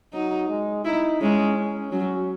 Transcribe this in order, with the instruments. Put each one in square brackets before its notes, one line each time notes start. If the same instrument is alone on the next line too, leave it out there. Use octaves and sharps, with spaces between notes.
[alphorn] F#3 [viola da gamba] D#4
[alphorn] G#3
[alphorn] D#4 [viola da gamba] E4
[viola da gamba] G#3 [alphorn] C#4
[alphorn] C#4
[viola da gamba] F#3 [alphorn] C#4